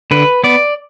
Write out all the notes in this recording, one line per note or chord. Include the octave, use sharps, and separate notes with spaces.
D3 B4
B3 D5